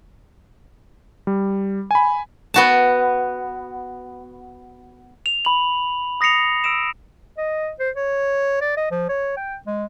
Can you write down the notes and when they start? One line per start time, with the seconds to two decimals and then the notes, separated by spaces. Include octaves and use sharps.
1.27 G3
1.91 G#5 B5
2.54 B3 F#4 A5
5.26 F7
5.45 B5 F#7
6.21 D#6 A#6 C7 C#7 F7
6.64 E6 D7 E7
7.38 D#5
7.79 C5
7.96 C#5
8.61 D5
8.77 D#5
8.91 F3
9.09 C#5
9.37 G5
9.67 G#3